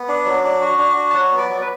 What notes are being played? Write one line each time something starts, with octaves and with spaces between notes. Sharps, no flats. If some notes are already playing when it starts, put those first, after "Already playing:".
Already playing: B3
D4
F#3
D4
F#4
D4
F#4
A5
F#3 F#5
B3
D5
F#3 D5
B4